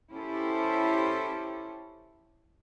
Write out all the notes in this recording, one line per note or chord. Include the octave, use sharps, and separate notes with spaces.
C#4 E4 G4 A4 C5